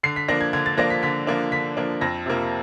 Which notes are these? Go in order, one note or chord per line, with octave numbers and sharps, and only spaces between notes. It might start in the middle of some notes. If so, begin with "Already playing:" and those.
D3 C7
B6
F3 A#3 D4 A#6
G#6
D3 G#6
A6
F3 A#3 D4 A#6
B6
D3 B6
F3 A#3 D4
D3 B6
F3 A#3 D4
F2 A#6
C3 F3 A#3